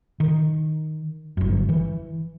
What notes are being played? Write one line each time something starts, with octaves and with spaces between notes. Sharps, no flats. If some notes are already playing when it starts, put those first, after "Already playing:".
D#3
G1 F#2
E3